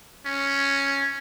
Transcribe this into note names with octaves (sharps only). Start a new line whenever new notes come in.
C#4